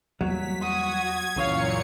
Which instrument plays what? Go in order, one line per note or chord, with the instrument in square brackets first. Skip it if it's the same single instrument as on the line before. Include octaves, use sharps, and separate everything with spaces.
[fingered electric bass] E2 G3 A#3 [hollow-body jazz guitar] F#3 [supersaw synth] B6
[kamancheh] F#4 D#6 [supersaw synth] G#6
[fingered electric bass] C#2 E3 [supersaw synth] F#2 A#2 C#7 [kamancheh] C#5 F5